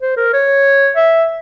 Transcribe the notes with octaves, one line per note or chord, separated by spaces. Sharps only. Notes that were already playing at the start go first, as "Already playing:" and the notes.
C5
A#4
C#5
E5